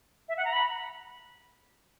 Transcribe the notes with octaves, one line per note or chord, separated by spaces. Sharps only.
E5
F#5
A#5
B5